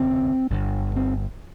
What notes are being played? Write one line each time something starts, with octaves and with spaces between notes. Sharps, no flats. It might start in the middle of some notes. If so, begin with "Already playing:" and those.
Already playing: F1 D#2 C#3 C4
G1 G2 D3
C4